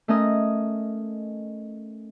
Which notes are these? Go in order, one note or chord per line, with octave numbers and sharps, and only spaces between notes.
A3 C#4 A#4 D#5